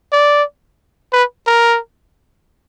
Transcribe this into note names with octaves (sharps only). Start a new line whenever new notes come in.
D5
B4
A#4